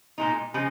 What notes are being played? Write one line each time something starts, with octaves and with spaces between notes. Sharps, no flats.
A#2 G#3 D#4
C#3 F3 G#3 G#4